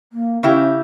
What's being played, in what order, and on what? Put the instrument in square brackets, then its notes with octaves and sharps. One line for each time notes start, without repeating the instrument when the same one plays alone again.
[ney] A#3
[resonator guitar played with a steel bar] C#3 E4 G4 [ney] C#4